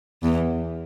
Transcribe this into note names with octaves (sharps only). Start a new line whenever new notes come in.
E2